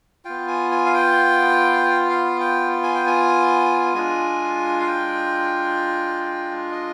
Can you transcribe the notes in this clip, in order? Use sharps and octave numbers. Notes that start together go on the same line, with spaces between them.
B3 F4 G5
G#5
G#5
F5
G5
F5
G5
G#5
G5
G#5
G#3 D4 F4 G#5
F5
G5
D#5